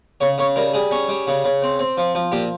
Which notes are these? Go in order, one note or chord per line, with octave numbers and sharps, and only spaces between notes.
C#3 C#5
C#3 C#5
G3 A#4
G3 G#4
C#4
G3
C#3
C#3
C4
C4
F3
F3
A#2 G4